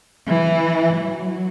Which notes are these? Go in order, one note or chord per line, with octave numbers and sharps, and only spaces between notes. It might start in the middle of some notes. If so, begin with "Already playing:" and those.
E3
F#3